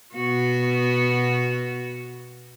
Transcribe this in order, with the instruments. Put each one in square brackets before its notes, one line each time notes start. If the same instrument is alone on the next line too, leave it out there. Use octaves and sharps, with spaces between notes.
[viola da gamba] B2 B3 F#4